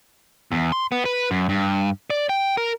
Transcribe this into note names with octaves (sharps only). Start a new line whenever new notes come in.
E2
C6
B3
B4
F#2
G2
D5
G5
A#4